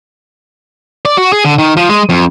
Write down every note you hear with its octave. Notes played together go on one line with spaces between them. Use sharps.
D5
F#4
G#4
D3
D#3
F3
G#3
F2